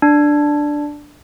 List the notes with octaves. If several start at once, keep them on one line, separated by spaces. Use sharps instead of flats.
D4